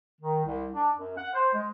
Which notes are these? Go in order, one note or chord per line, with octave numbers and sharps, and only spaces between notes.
D#3
C2
D4
F#2
F#5
C5
G#3